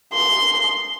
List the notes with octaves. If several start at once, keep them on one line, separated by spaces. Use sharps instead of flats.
C6